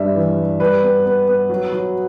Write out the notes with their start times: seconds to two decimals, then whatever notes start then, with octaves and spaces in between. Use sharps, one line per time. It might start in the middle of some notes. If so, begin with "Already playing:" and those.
Already playing: G2 G3 E5
0.15 E3
0.37 G3
0.60 G3 B4
0.83 B3
1.05 B3
1.28 B3
1.50 F#3
1.72 F#3